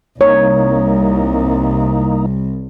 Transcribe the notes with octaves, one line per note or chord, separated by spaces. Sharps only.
C2 A#3 D#4 C#5